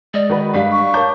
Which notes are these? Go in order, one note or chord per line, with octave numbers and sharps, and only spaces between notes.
G#3 D5 D#5
D#3 F#4 B4
G2 G3 F5 B6
C#6
A#4 C#5 A5 A#5 D6 G6